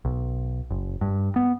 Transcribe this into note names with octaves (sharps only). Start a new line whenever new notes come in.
B1
F#1
G2
B3